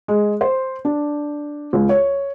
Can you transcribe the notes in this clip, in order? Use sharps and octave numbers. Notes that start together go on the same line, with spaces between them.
G#3
C5
D4
C#2
C#5